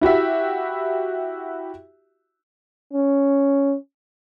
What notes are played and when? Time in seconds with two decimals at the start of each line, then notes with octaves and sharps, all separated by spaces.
0.01 E4 F#4 G4 E5
2.93 C#4